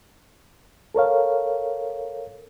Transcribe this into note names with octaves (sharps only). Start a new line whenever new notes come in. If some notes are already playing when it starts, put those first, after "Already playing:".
A4 A#4 C#5 F5